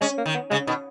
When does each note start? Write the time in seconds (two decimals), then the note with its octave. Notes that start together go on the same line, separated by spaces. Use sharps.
0.01 G#3 C#4
0.18 A#3
0.26 D#3
0.34 B3
0.50 C#3 G#3
0.67 B2 D#3